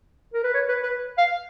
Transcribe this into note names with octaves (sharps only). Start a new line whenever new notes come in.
A#4
B4
C#5
B4
B4
F5